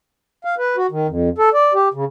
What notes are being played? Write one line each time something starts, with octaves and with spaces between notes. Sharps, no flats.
F5
B4
F#4
D#3
F2
A4
D5
G4
C#3